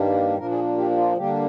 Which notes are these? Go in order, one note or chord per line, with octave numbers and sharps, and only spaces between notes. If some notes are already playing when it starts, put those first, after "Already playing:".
Already playing: G2 D#3 G3 A#3 D4
A#2 F3 A#3 D4 A#4
G#4
G4
G4
F4
D3 G3 A#3 D4 G4